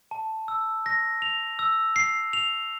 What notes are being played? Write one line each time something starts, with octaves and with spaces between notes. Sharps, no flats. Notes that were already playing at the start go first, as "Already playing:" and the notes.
A5
E6
A#6
F7
E6
C7
F7